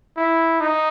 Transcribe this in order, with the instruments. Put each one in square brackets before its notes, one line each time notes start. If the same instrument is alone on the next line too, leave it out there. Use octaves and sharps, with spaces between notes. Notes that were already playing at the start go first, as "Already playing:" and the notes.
[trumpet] E4
D#4